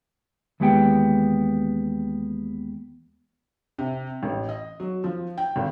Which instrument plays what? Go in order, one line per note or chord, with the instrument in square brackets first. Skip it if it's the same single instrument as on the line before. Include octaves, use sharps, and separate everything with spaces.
[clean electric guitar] D#2 E3 G#3 B3 G4 G5
[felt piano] C3
A1
D#5
F#3
F3
G5
G#1